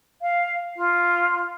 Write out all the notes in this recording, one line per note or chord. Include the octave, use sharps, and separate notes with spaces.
F5
F4